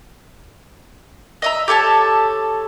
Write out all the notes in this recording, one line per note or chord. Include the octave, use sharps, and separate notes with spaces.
D#5 E5 A#5
G4 A4 C#5 A5